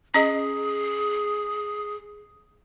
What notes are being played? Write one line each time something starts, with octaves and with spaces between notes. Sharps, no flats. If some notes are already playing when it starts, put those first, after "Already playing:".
C#4 G#4 D#5